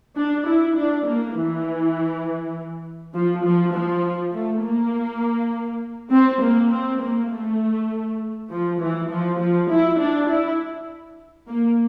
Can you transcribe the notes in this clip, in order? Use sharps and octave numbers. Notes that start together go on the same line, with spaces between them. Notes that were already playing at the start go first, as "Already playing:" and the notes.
D4
E4
D4
A#3
E3
F3
F3
F3
A3
A#3
C4
A#3
C4
A#3
A3
F3
E3
F3
F3
E4
D4
E4
A#3